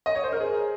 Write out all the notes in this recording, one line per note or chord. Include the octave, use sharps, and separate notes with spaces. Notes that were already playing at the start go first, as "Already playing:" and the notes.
D#5
C#5
C5
A#4
G#4